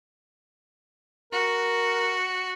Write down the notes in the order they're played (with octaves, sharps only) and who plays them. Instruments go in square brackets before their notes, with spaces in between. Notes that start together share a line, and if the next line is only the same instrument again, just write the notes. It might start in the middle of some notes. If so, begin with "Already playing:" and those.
[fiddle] F#4 [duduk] A#4